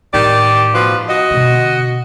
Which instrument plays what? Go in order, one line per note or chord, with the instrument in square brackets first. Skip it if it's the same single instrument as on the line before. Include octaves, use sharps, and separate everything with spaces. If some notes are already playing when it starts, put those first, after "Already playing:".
[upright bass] A2 [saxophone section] D#3 G4 D5
[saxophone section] B2 F3 B4
F#4 D#5
[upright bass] B2 D3